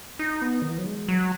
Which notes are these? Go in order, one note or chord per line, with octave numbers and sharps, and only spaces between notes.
D#4
B3
D#3
E3
F#3
G#3
F#3